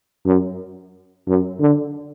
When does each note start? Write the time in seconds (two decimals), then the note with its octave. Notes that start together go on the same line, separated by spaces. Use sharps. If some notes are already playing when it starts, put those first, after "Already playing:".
0.26 F#2
1.28 F#2
1.61 D3